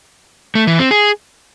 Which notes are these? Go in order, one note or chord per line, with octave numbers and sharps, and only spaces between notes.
A3
E3
C4
G#4